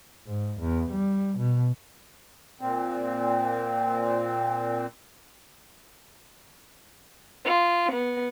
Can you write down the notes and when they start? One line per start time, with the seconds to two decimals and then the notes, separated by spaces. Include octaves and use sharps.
0.27 G#2
0.61 E2
0.92 G3
1.38 B2
2.61 A#2 C4
7.43 F4
7.91 B3